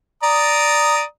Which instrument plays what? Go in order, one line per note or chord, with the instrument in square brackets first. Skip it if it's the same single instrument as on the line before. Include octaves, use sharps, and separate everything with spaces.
[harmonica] D5 A#5 D#6